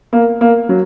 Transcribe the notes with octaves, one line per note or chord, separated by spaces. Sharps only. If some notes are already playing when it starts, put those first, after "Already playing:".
A#3
A#3
F#3